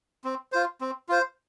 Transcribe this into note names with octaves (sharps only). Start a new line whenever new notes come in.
C4
F4 C5
C4
F4 C5